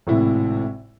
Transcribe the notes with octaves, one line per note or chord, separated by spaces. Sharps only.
G#1 A2 C3 E4